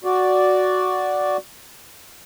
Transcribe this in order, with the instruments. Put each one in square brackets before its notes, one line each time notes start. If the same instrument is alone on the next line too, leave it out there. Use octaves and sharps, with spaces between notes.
[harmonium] F#4 D5